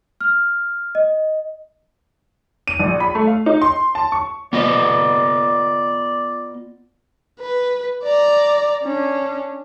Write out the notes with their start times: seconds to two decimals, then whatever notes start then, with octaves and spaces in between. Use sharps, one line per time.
0.21 F6
0.95 D#5
2.68 D#7
2.80 A#1
3.00 B5
3.15 A3
3.27 F5
3.46 D#4
3.62 C6
3.95 A5
4.12 C#6
4.53 B3 F4 D5 D#5
7.41 B4
8.04 D5 A#5
8.83 C#4 D4